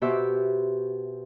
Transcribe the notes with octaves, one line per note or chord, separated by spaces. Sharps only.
B2 F#4 G4 C5 E5